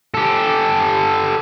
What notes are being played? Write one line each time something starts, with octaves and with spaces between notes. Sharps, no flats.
G4 A4